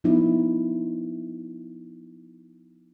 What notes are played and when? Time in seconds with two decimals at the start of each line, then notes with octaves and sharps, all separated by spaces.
0.04 F3 B3 D#4 E4